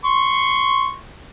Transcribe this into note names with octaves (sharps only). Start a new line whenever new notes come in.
C6 C#6